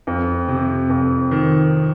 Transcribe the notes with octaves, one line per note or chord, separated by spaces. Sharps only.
F2
C3
F2
D#3